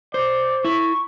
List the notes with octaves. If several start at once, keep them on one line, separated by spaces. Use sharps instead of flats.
C5 D5
E4 C#6